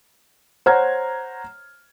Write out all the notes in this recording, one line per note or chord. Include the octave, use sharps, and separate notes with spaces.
C5 C#5 F#5 A#5 F6 G#6